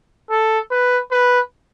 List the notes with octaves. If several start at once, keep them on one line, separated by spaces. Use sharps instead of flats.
A4
B4
B4